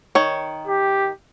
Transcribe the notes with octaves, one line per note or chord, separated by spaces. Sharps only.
D#3 C#5
G4